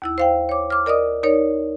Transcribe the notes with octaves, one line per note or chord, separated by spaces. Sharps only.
D#2 E4 E6
C5 F5 G5
C#5 D6
D6 F6
A#4 D5 D#5 D#6
D#4 A#4 C#5 D5